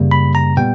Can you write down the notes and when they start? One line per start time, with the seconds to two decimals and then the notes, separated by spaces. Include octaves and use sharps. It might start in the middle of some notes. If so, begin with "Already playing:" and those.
Already playing: F#2 C#3 G3 A#3
0.11 B5
0.35 A#5
0.57 A#2 G3 B3 G5